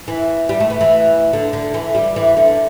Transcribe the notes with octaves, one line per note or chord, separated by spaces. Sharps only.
E3
G3
A3
B3
E3
D3
D3
E3
G3
E3
D3